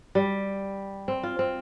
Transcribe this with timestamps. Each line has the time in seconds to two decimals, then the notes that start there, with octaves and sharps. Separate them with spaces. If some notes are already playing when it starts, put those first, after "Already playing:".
0.15 G3
1.08 C4
1.23 F4
1.39 C4